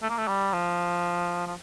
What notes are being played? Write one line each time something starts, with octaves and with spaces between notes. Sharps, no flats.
A3
A#3
A3
G3
F3
F3